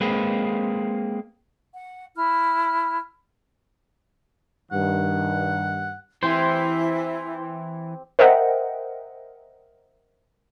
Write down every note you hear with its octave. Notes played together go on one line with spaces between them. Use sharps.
G#3 A#3 C4 B4
F#5
E4 F6
G2 D#3 F#5
E3 C4 E4 G4 C5
A#4 C5 D#5 E5 F#5 G5